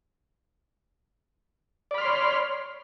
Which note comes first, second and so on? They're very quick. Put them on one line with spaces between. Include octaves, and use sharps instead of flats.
D5 B5 F6 C6 C#5